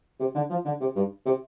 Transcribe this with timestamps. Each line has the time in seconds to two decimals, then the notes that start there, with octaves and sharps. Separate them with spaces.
0.20 C3
0.35 D3
0.50 F3
0.65 D3
0.81 C3
0.96 G2
1.26 C3